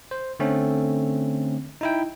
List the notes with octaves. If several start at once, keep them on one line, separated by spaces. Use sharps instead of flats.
C5
D3 A3 C4 C#4
D#4 E4 G5